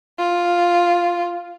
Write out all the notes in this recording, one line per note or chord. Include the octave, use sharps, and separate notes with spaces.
F4